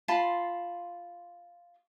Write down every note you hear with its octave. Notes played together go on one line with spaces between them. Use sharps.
F4 A5 B5 C6